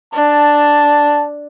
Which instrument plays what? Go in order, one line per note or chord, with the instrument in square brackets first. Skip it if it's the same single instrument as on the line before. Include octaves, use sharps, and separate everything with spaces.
[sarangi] D4 [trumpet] A5